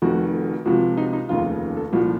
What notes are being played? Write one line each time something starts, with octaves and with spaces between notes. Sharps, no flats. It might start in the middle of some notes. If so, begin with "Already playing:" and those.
F1 F2 D#3 F#4
C#2 C3 F3 F#4
D#4
D#4
F1 D#2 C#3 F3 F4
A4
C2 A#2 F3 F#4